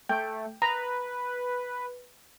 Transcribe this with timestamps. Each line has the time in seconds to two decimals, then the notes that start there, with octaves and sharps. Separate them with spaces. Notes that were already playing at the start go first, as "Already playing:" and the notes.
0.09 A3 G5
0.62 B4 A#5